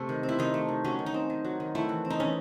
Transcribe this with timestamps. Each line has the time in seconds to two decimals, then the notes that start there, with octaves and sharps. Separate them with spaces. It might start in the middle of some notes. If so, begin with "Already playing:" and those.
Already playing: C3 A3
0.09 D#3
0.23 C4
0.29 E4
0.39 D#3 D#4
0.54 A3
0.69 D#3
0.84 F#3 C#4
0.99 D#3
1.06 D#4
1.14 C4
1.30 D#3
1.45 F#3
1.60 D#3
1.75 A3 E4
1.89 E3
2.05 C4
2.10 D#4
2.20 E3 C#4